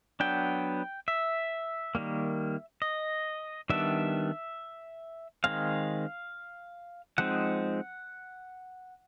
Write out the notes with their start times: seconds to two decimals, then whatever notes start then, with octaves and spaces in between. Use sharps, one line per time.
0.20 F#3 B3 D4 G5
1.08 E5
1.95 D#3 G3 A#3
2.82 D#5
3.70 D#3 G3 B3 D4 E5
5.44 D#3 G#3 C4 F5
7.18 F3 G#3 C4 D#4 F#5